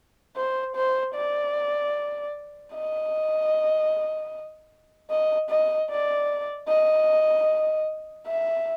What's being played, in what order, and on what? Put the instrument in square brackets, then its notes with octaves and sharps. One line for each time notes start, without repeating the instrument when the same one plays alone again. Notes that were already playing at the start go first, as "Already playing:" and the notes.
[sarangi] C5
C5
D5
D#5
D#5
D#5
D5
D#5
E5